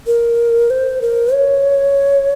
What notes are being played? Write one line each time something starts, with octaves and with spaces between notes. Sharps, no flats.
A#4
C5
A#4
C#5